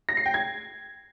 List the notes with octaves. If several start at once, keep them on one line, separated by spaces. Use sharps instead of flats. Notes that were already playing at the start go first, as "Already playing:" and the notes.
A#6
C7
G5
G#6